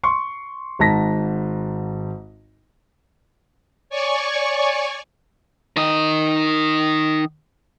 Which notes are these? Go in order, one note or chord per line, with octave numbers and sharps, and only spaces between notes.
C6 C#6
G#1 G#2 A5 A#6 B6
C#5 D5 G#5 C#6
D#3 D#5